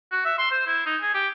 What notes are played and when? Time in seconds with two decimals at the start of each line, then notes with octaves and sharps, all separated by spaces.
0.12 F#4
0.25 E5
0.39 C6
0.51 C5
0.66 E4
0.86 D#4
1.01 G#4
1.15 G4